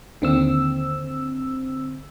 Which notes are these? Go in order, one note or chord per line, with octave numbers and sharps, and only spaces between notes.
D#2 D3 C4 E6